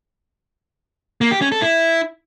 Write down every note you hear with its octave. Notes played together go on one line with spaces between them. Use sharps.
A#3
G4
C#4
A4
E4